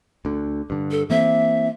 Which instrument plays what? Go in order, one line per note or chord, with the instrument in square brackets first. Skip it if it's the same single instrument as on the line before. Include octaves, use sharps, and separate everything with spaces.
[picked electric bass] D2 D3
G2 D3
[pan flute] A4
[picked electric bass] E3 A#3 C4 [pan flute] E5